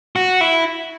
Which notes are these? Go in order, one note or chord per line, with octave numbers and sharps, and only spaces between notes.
F#4
E4